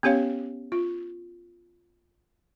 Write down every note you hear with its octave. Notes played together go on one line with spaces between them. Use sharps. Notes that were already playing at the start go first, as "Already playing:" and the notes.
B3 C#4 G4 C#5 F5
F4